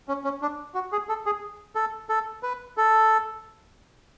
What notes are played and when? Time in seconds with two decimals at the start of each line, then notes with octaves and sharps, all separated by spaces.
0.08 C#4
0.24 C#4
0.42 D4
0.74 F#4
0.92 G#4
1.09 A4
1.26 G#4
1.75 A4
2.09 A4
2.43 B4
2.77 A4